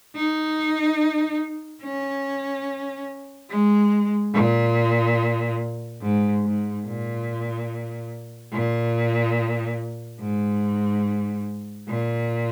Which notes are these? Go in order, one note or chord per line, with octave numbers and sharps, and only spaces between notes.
D#4
C#4
G#3
A#2
G#2
G#2
A#2
A#2
G#2
A#2